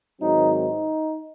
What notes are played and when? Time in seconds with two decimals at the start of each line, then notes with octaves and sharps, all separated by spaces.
0.20 G#2 D#3 F#3 C4 D#4
0.54 D#4